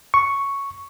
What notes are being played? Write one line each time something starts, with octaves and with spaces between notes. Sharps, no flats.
C#6